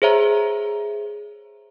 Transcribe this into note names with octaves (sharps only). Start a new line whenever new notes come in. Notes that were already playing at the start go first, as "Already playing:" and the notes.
G#4 C5 C#5 E5 A#5